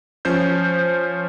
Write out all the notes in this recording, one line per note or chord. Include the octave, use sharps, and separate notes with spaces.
F3 C#4 C5 G6